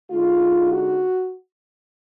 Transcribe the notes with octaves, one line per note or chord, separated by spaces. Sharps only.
D3 G#3 D#4 F4
F#4